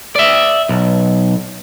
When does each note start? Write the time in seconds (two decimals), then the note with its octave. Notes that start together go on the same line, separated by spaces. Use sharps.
0.16 D5 E5
0.69 B1